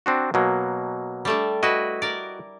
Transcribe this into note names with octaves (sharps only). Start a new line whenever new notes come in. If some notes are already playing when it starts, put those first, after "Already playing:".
C4 D4 F#4
B2 F#3 A#3
G3 A3 D4
E4 F#4 B4 D#5
A#4 D5